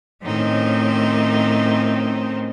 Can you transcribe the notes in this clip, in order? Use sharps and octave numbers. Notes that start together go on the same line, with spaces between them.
A2 D#3 C4 C#4 D#4